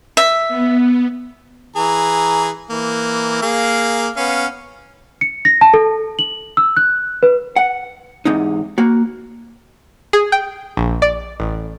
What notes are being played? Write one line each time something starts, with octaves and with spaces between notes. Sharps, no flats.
E5
B3
E3 G#4 A#5
E3 A#3
A#3 G#4 F5
B3 C#4 F5
C#7
A#6
A5
A4
F#7
E6
F#6
B4
F#5
E2 G#2 C3 D#4
A#3 F#4
G#4
G5
A#1
D5
A1